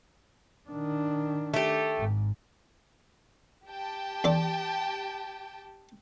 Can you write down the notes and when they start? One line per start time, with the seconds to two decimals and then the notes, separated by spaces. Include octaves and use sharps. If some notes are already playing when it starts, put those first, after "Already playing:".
0.69 D#3 D4
1.54 A3 G4
1.97 G#1 G#2
3.67 G4 G5 A5
4.24 E2 A4 D5